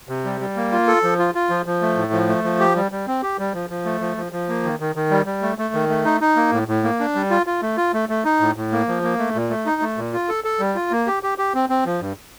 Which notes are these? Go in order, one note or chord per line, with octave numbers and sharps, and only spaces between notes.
C3
G3
G3
A#3
F4
A4
F3
F4
F4
F3
F3
A3
A2
F3
A3
F3
G4
G3
G3
C4
G4
G3
F3
F3
A3
F3
F3
F3
A#3
D#3
D#3
D#3
G3
G3
A3
A3
D#3
A3
D#4
D#4
A#3
A2
A2
A#3
D4
G3
F4
F4
A3
F4
A3
A3
D#4
A2
A2
A#3
F3
A#3
A3
A#2
A3
D#4
A3
A#2
F4
A4
A4
G3
F4
A#3
G4
G4
G4
C4
C4
F3
G2